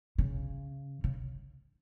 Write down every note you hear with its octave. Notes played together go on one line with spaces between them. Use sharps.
C#3
C#3